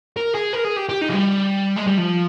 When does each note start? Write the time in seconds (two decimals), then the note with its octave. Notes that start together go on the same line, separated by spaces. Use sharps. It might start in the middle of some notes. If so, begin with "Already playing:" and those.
0.17 A#4
0.35 G#4
0.53 A#4
0.65 G#4
0.77 G4
0.89 G4
1.01 D#4
1.09 F3
1.13 G3
1.77 G#3
1.88 G3
1.98 F3